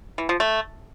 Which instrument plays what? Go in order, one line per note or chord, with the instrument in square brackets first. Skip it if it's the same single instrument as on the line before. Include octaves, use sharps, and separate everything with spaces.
[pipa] E3
F3
A3